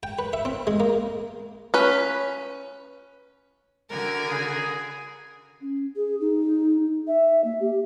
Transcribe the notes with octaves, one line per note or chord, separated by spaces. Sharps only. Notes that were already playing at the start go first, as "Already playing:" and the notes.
G5
B4
E5
C4
G#3
A#3
C#4 B4
D3 F#4 A#4 G#5
G#4
C#4
G#4
D#4
E5
A#3
G4